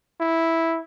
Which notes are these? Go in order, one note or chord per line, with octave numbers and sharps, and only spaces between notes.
E4